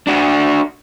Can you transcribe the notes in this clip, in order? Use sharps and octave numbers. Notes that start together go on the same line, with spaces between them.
D4 F#4